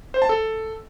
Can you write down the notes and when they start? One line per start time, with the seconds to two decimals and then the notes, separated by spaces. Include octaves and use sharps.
0.14 C5
0.22 A5
0.29 A4